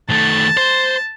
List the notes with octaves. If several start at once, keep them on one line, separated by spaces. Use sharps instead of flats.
D#3 A3 A5
C5